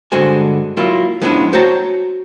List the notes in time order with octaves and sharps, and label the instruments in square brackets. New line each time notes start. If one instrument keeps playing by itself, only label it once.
[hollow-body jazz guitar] G2 D3 G#3 F#4 C5 G#5
F#3 A#3 E4 F4
F3 G#3 B3 C#4 D4 E4
F#4 C5 C#5 G5 A5 A#5